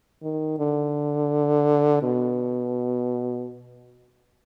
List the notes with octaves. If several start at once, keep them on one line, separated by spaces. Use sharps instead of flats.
D#3
D3
B2